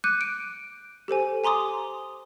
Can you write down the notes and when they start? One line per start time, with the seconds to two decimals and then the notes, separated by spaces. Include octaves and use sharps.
0.04 D6 F#6 G6 C#7 D#7
0.21 D7
1.08 G4 A4 C5 G#5
1.44 G#5 A#5 C6 D6 D#6